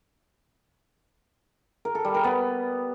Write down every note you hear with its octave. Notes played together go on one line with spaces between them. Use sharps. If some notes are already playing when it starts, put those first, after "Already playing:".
A#4
A4
G3
A#4
B3